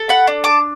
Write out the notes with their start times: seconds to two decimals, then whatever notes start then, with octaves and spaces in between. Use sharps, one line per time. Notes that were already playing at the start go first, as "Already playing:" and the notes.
Already playing: A4
0.09 F#5 B5
0.27 D4
0.44 A5 D6